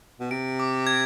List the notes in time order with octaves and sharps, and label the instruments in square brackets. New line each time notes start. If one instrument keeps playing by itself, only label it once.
[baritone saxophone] B2
[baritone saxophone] C3 [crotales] D7
[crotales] D6
G#6